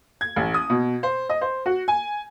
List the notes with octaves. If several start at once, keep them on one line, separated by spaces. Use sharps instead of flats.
G#6
A1
D#6
B2
C5
D#5
C5
F#4
G#5